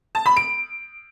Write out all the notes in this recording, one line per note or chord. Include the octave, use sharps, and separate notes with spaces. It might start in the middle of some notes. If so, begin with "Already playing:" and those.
A5
B5
D7